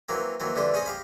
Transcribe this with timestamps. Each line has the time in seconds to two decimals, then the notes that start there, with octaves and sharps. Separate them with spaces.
0.09 E3 F#3 A#3 C4
0.40 D#2 E3 F#3 C4
0.56 D3 E3 G3 A4 C5
0.74 C#4 G#4 C5 D#5
0.86 G4 F5 B5